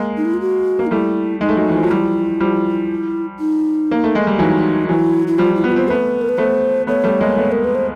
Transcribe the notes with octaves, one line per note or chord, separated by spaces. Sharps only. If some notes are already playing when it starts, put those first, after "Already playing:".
Already playing: G#3 A#3
D#4
E4
F4
F#4
A#3
D#4
G3 A3 E4
G#3 D#4
A3
F#3 G#3
E3
F3
F#3 F4
F3 G3 E4
F3 G3
D#4
A#3
A3
G#3
G3
E3 F#3 D#4
E3 F#3 E4
E4
F3 G3 F4
E4
B3 F#4
C4 F4
A3 B3 B4
A#4
B4
A3 B3 C5
A3 B3 C#5
G3 A3
G#3 A#3
A3 B3
A#4
B4
C5